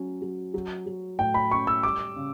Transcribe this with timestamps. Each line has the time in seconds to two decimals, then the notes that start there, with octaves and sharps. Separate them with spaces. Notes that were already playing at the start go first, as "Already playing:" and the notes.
Already playing: F#3 C#4
0.22 F#3
0.54 F#3
0.86 F#3
1.19 A2 G5
1.34 B5
1.51 C#4 C#6
1.67 E6
1.83 G3 D6
2.16 C#3